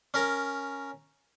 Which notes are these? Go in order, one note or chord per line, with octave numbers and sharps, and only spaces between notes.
C#4 A#4 A#5